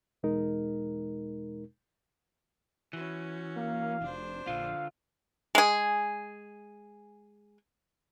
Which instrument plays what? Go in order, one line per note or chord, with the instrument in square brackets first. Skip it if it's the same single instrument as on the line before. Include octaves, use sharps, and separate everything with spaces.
[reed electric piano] E2 B2 G#3 D#4 A#4
[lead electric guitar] E3 [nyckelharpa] C#4 F#4
[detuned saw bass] A#3 [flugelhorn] F5
[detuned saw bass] F1 [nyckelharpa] D4 C5
[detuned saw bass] A#1 [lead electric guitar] D3 F4 [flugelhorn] F5
[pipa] G#3 G#4